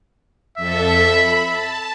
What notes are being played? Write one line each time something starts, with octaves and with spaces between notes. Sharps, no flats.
F2 A4 E5
B5
A5